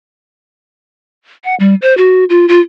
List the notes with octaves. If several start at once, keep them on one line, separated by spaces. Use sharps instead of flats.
F#5
G3
C5
F#4
F4
F4